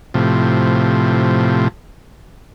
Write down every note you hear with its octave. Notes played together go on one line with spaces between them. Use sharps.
A2 C3 F3